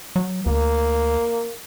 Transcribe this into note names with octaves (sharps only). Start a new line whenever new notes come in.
F#3
D2 A#3